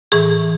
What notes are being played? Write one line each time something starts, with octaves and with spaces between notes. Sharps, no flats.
A2 E3 G#4